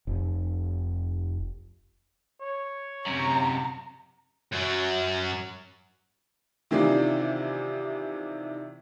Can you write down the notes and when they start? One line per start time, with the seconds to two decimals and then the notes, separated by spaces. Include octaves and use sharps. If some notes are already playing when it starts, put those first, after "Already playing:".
0.07 F1
2.41 C#5
3.06 F#2 C3 A#5
4.53 F#2 F#3
6.71 C3 D#3 E3 D4 F4